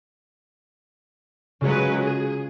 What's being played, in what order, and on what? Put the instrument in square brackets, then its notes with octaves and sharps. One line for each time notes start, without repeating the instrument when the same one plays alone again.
[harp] C#3 F4 C#5 [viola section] F#3 G#3 B4
[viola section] G#4